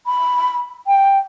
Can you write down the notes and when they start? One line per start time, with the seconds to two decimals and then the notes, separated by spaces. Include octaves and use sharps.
0.06 B5
0.87 G5